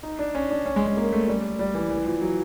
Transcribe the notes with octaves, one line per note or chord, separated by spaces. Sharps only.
D#4
D4
C#4
D4
C#4
G#3
G#3
A#3
A3
G3
G3
E3
E3
F3
F#3